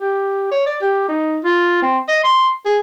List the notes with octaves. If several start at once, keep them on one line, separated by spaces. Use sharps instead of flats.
G4
C#5
D5
G4
D#4
F4
C4
D#5
C6
G#4